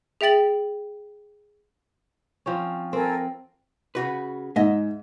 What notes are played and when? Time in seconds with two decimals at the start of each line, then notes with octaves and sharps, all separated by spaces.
0.21 G#4 E5 G5 A6 F#7
2.46 F3 C4 C#4
2.93 C4 A4 A#4 G#5
3.95 C#3 F#4 B4
4.56 G#2 D#5 E5